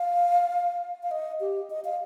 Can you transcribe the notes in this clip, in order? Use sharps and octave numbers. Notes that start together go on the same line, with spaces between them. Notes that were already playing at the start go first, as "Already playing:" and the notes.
Already playing: F5
F5
D#5
G4
D#5
F5